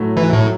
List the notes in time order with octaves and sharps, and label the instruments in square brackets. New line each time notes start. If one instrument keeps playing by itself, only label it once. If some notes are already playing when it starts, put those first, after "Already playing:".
Already playing: [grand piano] A2 F#3 A3
[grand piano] A2 [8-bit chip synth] E3
[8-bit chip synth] A2
[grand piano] F#3